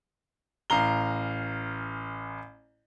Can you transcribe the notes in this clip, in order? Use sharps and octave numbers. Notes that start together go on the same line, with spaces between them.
A1 F5 A#5 G7